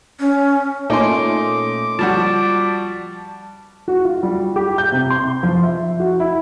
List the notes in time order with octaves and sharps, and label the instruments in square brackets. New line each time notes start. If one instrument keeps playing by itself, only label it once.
[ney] C#4
[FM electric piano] A#2 A3 C#4 [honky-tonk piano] D#4 C6 [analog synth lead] D6
[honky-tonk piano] F3 G3 F#4 [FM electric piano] A5
[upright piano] F#4
F4
G3
G4
G6
C3
C6
F3
E5
F#4
E4